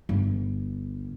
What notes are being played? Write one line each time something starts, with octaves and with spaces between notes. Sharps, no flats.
G1